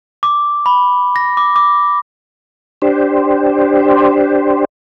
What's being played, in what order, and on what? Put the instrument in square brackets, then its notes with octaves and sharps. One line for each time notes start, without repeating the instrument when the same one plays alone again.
[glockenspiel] D6
B5
A#6
D6
D6
[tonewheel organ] D4 G4 C5